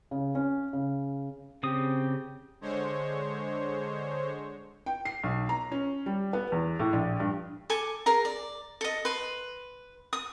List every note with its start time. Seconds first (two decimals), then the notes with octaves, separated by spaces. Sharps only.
0.11 C#3
0.35 C#4
0.73 C#3
1.63 C#3 C4 G4 D#6
2.61 D3 G#3 C5 C#5
4.86 G5
5.05 C7
5.23 B1
5.49 A#5
5.72 C#4
6.06 G3
6.33 B3
6.52 E2
6.80 A2
6.93 A#1
7.20 G2
7.70 A4 G#5 D6
8.06 G#4 A#4 A#5
8.25 D5
8.81 A4 D#5
9.05 B4 C6
10.13 D#6